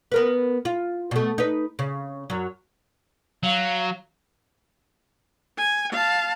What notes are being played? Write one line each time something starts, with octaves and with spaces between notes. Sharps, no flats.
B3 A#4 B4
F4
B2 A3
D#4 B4
C#3
F#2 F#3
F#3 F5
G#5
F5 A5